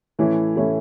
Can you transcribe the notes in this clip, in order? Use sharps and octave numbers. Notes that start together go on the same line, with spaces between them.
A2 E3 A3 C#4 E4
A2 E3 A3 C#4 E4